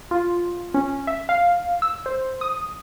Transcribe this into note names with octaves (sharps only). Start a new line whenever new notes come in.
F4
C#4
E5
F5
E6
C5
D#6